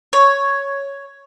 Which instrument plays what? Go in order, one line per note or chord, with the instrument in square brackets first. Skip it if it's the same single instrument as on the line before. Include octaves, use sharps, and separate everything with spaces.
[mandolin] C#5